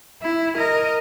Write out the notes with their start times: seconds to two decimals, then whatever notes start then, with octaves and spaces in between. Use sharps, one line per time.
0.22 E4
0.56 A#4 D#5